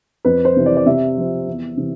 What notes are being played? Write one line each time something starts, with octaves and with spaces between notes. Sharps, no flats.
F2 B4
C5
C3 E3
D5
D5
C3 E5
F3 C4
E2
C3 E3